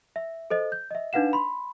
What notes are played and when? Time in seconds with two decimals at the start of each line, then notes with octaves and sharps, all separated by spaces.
0.16 E5
0.50 A4 C5 D#5
0.72 G6
0.91 D#5 E5
1.13 D4 D#4 B4 F5 F#5 E7
1.33 B5 C6